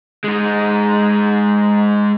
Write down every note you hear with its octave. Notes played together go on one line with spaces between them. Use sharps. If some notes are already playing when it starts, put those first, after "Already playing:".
G#3 D#4